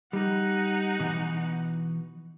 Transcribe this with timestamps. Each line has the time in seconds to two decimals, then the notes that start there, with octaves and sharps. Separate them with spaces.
0.13 G3 D#4 F#5
1.00 B2 E3 G#5